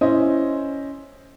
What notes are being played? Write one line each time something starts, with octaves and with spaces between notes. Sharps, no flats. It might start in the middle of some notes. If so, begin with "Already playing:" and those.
C#4 E4 C5 D#5